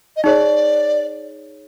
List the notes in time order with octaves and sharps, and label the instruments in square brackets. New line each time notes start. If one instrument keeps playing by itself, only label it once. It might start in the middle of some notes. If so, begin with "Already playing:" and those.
[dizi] D#5
[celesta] D#4 G#4 C#5 [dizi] D5